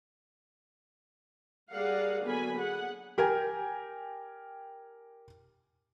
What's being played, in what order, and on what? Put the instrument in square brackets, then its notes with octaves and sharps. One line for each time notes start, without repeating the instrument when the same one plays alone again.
[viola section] G3 G#4 A#4 D5 F5 F#5
D3 F#3 A#3 B3 G#5 B5
G#4 F#5
[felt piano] G4 A#4 G5 G#5